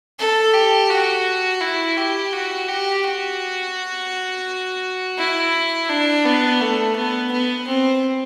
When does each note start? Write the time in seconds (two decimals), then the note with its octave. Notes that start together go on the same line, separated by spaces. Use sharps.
0.19 A4
0.54 G4
0.90 F#4
1.62 E4
1.97 G4
2.33 F#4
2.68 G4
3.04 F#4
5.19 E4
5.89 D4
6.25 B3
6.61 A3
6.96 B3
7.32 B3
7.68 C4